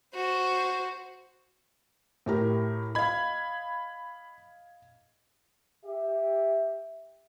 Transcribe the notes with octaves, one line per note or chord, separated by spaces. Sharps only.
F#4 C5
A2 G4 A#4
D#5 F5 B5 G#6
G4 E5